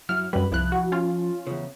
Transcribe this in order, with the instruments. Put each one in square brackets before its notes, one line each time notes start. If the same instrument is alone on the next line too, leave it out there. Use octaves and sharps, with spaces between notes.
[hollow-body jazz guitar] F#2 F#3 E4 [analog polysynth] F6
[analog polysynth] F#2 G3 [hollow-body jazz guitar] B4 B5
[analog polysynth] C2 F#6 [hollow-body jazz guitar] F3 E4
[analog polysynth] F#4
C#4 F4
[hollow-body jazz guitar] E2 C#3